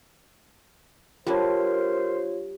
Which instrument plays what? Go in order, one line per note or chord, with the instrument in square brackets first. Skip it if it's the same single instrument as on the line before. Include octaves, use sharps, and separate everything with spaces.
[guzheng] G3 D4 [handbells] F4 C#5 [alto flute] A#4 [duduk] C5